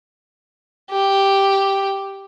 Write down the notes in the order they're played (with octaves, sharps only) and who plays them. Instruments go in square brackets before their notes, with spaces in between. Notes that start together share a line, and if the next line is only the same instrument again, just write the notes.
[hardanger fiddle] G4